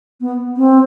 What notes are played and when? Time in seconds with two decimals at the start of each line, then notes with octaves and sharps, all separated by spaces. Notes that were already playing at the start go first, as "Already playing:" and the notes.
0.21 B3
0.56 C4